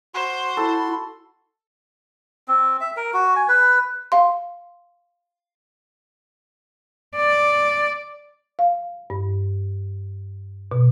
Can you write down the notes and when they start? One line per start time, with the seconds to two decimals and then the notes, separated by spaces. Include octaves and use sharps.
0.14 F#4 C5 C6
0.57 E4 A4
2.48 C4
2.81 E5
2.97 A#4
3.13 F#4
3.36 G#5
3.48 B4
4.12 F5 C6
7.16 D5
8.59 F5
9.10 G2
10.72 B2